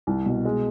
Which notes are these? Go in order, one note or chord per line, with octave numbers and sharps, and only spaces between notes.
C2
B2
G#3